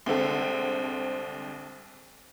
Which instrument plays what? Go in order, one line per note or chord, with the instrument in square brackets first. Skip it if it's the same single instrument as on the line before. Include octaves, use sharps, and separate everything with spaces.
[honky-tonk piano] C2 D3 G#3 C4 A4